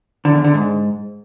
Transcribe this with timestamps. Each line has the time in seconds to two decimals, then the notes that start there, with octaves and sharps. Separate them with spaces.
0.25 D3
0.35 E2
0.44 D3
0.54 G#2